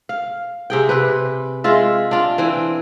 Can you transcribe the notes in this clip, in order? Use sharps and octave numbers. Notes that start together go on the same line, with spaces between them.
F5
C3 G#4 G5
C3 B4
G#3 F4 E5
D4 F4
E3 C4